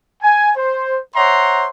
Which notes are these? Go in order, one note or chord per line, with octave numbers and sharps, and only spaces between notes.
G#5
C5
C5 C#5 E5 F#5 A#5 C6